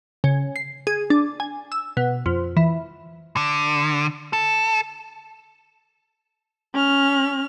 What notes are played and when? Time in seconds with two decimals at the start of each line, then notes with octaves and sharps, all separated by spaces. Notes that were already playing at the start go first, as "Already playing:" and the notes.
0.24 C#3
0.56 C7
0.87 G#4
1.10 D4
1.40 G#5
1.72 E6
1.97 B2
2.26 F2
2.57 E3
3.37 D3
4.33 A4
6.74 C#4 F6